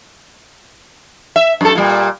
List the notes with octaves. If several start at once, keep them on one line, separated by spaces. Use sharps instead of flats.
E5
F#2 A4
A#2 G3